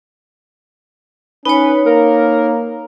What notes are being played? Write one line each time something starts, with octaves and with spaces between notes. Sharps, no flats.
C#4 D#4 B4 C#5
A#3 A#4